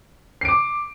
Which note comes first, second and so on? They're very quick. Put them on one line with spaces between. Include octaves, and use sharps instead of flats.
C7 D7 D6